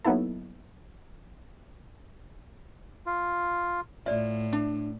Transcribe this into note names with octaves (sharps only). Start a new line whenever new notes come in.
F#3 A#3 B3 D#4 E4 A4
F4
A2 F4 D5 E5
D4